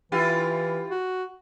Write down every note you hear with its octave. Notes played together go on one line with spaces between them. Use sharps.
E3 E4 F4 G4
F#4